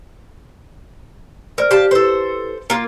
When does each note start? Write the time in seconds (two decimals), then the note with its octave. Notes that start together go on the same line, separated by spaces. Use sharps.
1.58 A#4 C5 D5 F6
1.71 G4 F5 A5
1.91 E4 G4 A4 B4 C5
2.70 A#3 F4